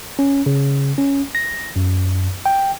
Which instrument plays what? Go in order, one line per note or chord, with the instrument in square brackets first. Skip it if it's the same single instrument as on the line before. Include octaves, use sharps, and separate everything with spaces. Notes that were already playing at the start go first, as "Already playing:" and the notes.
[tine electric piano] C#4
C#3
C#4
A#6
F#2
G5